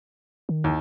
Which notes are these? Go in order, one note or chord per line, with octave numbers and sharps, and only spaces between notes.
D#3
D#2